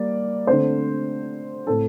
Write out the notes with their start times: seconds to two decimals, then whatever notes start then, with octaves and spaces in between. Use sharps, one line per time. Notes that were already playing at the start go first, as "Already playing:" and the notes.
Already playing: G3 A#3 D5
0.47 D3 A3 C4 C5
1.67 A2 A3 C4 A4